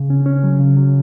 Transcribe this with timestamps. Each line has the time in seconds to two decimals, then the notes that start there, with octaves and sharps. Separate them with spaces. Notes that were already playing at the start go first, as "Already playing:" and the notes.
Already playing: C#3
0.10 C#4
0.26 C#4
0.43 F#3
0.60 C#3
0.77 F#3